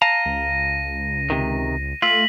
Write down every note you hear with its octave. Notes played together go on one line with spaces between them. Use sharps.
F5 A5 A#5 A#6 D#7
C#2
C3 D#3
A3 F4 E6 B6 F#7